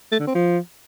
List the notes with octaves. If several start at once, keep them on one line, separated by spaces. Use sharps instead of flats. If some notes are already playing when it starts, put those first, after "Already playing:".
A3
D3
C4
F3